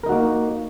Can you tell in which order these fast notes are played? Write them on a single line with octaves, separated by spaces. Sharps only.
A#4 D#4 F#4 A#3